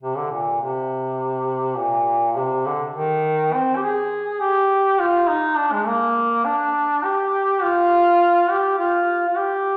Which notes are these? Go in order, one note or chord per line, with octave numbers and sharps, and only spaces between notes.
C3
D3
A#2
C3
A#2
C3
D3
D#3
C4
G4
G#4
G4
F4
D#4
D4
G#3
A#3
D4
G4
F4
G4
F4
F4
G4